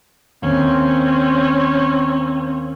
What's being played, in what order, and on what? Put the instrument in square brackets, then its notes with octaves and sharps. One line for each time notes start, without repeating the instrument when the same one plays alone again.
[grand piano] D#2 [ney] C4 [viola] C#4